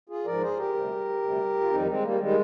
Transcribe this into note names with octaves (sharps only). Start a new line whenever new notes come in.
F4 G#4
G#2 F3 A#4 D5
G#4 C5
G4 A#4
D2 C3 G3
D2 C3 G3
F4
F2 D#3 G3 C4 D#4
G#3 C4
G3 A#3
D#3 G3 G#3